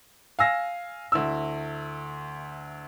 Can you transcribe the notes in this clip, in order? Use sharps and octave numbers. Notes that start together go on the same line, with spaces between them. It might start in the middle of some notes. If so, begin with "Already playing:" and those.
F5 G#5 E6 A#6
D2 E4 E6